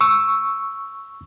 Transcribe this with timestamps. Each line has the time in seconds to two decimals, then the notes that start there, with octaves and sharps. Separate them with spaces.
0.01 C#6 E6